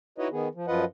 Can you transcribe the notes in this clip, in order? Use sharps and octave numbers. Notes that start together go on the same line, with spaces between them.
D#4 E4 F#4 B4 C#5 D#5
D#3 B3 G#4
F3
F#2 F3 F4 B4 D#5 F#5